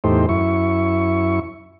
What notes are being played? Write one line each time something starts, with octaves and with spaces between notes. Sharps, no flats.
E2 A2 A3 D#4 G4 C5
F#2 E4 C#6